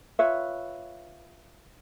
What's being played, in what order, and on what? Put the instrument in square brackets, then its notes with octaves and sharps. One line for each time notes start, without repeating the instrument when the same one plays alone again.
[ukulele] F4 B4 C#5 E5